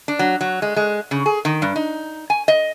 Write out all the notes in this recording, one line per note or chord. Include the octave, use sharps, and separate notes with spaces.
D4
F#3
F#3
G#3
G#3
C#3
G#4
D#3
G2
D#4
G#5
D#5